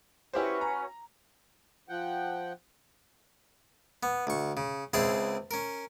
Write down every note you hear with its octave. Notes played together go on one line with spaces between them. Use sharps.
C#4 E4 F#4 G4 B4 C5
A#5
F3 F#5 G5
B3
D2 C#6
C#3
C#2 C4 E4 G#4 A5 C6
C#4 A#4